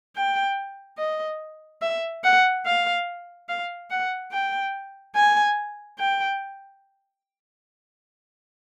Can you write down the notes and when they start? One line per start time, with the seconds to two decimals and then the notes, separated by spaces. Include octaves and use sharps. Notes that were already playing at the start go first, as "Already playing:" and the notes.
0.16 G5
0.98 D#5
1.82 E5
2.24 F#5
2.65 F5
3.49 F5
3.90 F#5
4.32 G5
5.16 G#5
5.99 G5